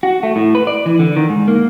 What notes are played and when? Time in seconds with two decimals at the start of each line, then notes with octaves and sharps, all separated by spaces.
0.03 F#4
0.23 A3
0.36 A2
0.55 B4
0.67 D5
0.86 E3
0.99 D3
1.17 D#3
1.29 G#2
1.48 A#3